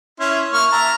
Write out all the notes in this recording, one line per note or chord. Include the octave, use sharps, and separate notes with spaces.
C#4 E4 C6
A#3 C#6 F6
E5 A5 A#5